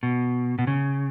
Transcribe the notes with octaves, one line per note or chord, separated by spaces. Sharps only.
B2
B2
C#3